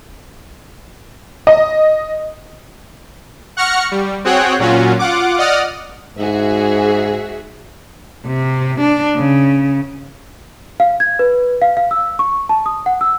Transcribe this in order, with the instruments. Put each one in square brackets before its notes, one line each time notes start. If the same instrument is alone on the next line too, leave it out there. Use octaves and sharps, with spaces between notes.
[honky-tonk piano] D#5
[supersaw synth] F#5 C#6 F6 A#6 C#7
G3
C4 F#4 G#4 C#5 F#5 G5
A#2 F#3 C#4 F4 F#4
F4 F#5 D6
D5 D#5 F#5 D#6 F6
[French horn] G#2 [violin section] F#4 G#4 E5
[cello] C3
D4
C#3
[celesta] F5
G#6
B4
F5
F5
E6
C#6
A5
D#6
F#5
E6